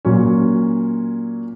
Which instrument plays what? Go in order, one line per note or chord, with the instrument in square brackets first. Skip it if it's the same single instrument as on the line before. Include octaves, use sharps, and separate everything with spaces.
[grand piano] A#2 F#3 C#4